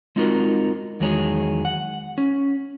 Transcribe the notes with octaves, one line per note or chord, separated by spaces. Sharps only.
G#3 C4 D#4 F4 F#4 A#4
E2 D#3 F#3 G#3 G#4 C#5
F#5
C#4